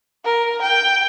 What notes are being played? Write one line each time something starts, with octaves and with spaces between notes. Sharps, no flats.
A#4
G5